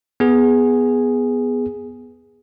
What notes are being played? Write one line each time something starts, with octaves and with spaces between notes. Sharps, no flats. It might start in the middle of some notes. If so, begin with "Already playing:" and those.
B3 G#4